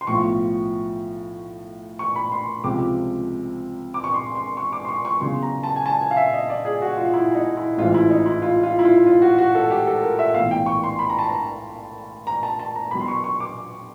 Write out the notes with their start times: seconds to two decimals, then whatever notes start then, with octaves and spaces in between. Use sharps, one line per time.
0.01 C6
0.07 B1 A2 F3 C#6
1.99 C#6
2.16 B5
2.32 C6
2.64 C#2 C3 F3 D6
3.94 D6
4.04 C#6
4.14 C6
4.35 C6
4.57 C#6
4.73 D6
4.85 C6
4.89 C#6
5.05 C#6
5.21 E2 C#3 F#3 C6
5.43 A#5
5.63 A5
5.76 G#5
5.86 A5
6.01 G#5
6.11 F5
6.17 E5
6.33 D#5
6.50 D5
6.65 G#4
6.82 F#4
6.97 F4
7.14 E4
7.35 D#4
7.57 E4
7.77 A1 G#2 E3 F4
7.94 E4
8.10 D#4
8.26 E4
8.42 F4
8.63 F4
8.79 E4
8.85 F4
9.06 F4
9.22 F#4
9.38 F#4
9.55 A4
9.71 G4
9.87 A4
10.03 A#4
10.19 E5
10.34 B1 A2 E3 F5
10.51 G5
10.66 C#6
10.84 C6
10.99 B5
11.09 A#5
11.19 A5
11.29 A#5
12.27 A#5
12.43 A5
12.59 A5
12.76 A#5
12.91 E2 B2 F#3 B5
13.01 C6
13.08 C#6
13.24 C#6
13.40 D6